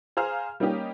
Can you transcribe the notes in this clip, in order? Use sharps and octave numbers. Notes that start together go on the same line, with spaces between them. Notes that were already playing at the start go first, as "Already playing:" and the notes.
G#4 C5 F5 A#5 F6
G3 A#3 C#4 D#4 G4